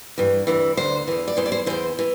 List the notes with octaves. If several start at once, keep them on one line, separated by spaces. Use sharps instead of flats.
G2 E3
D2 C3 E3
D2 D3 C5
E2 E3
D5
E2 E3 C5
D5
C5
E2 E3 C5
E3